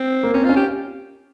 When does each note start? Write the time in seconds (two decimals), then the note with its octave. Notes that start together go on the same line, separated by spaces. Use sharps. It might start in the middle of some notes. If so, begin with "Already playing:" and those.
Already playing: C4
0.23 A#3
0.33 C4 C#4
0.45 C#4 F4
0.56 G4